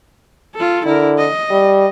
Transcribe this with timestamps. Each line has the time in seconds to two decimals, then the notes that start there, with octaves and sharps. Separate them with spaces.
0.55 F4 A4
0.86 D3 E4 A#4
1.18 D#5
1.51 G3